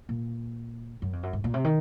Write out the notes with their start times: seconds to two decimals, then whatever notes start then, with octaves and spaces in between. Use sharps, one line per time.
0.09 A#2
1.02 F#2
1.13 F2
1.23 F#2
1.33 G#2
1.44 A#2
1.54 C3
1.64 D#3